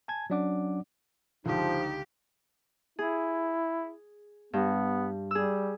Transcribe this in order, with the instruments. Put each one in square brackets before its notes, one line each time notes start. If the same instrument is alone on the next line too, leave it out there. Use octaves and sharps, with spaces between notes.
[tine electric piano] G#5 A5 G#6
F#3 C#4 D4 D5 F#5 D6
[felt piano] C#2 D3 [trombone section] F3 [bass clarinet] D#4 [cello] G4
[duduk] E4 [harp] G#4
[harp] G2 [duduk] B3
[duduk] G3 [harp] G#4 E6